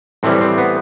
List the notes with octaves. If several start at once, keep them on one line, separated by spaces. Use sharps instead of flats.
A2 E3 G3 C4
C4
B3